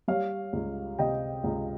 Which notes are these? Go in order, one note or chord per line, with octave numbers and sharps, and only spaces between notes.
G3 C#5 F5
C#2
C3 D#5 G5
C#2